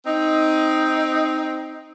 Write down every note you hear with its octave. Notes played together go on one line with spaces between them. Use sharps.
C4 D#4